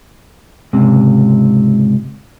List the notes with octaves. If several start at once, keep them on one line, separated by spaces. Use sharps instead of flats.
C#2 G#2 C3